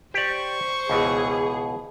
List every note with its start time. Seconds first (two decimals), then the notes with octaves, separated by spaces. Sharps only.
0.14 G4 C5 D5 C#6
0.90 C#2 B2 E3 G#4